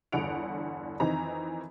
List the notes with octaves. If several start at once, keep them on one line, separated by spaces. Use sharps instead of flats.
G1 E2 D3 F#5 D7 F7
F2 D#3 E3 C4 D#4 A#5